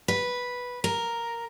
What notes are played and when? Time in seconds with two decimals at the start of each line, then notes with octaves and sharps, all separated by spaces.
0.08 B4
0.84 A#4